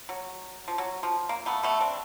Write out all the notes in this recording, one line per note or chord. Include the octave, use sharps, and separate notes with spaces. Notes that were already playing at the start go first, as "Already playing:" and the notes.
F#3
F3
F#3
F3
A#3
A3 B3
A3 B3
C4 D4